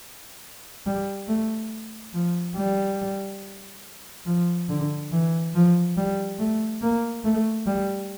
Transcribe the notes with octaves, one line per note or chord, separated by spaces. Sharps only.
G3
A3
F3
G3
F3
D3
E3
F3
G3
A3
A#3
A3
G3